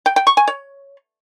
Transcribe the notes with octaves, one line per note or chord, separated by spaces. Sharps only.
G5
G5
C#6
G#5
C#5